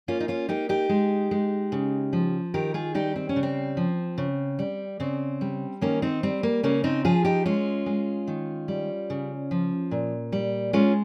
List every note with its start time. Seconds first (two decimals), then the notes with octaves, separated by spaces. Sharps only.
0.08 A#3 C#4 F4
0.20 D#4
0.28 C#4 F4
0.49 A#3 D#4 G4
0.69 D#4 G4
0.89 G#3
1.31 G#3
1.72 C#3
2.13 F3
2.54 D#3 G4 A#4
2.74 F4 G#4
2.94 G3 D#4 G4
3.16 C4
3.29 C#4
3.36 C#3
3.43 C4
3.77 F3
4.18 C#3
4.59 G3
5.00 C#3 C4
5.41 G3
5.81 D#3 A#3 C#4
6.02 C4 D#4
6.23 G3 C4
6.43 A#3
6.63 C#3 A#3 C#4
6.84 C4 D#4
7.05 F3 F4 G#4
7.25 D#4 G4
7.46 G#3 C#4 F4
7.86 G#3
8.27 D#3
8.68 G3
9.10 C#3
9.51 F3
9.91 A#2
10.32 G3
10.73 G#3 C#4 F4